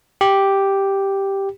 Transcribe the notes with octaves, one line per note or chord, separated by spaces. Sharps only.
G4